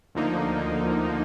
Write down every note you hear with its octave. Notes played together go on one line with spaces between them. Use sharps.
D2 D3 F3 A#3 D#4